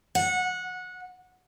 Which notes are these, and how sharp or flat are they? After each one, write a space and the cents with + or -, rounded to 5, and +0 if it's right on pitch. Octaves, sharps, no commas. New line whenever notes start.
F#5 -20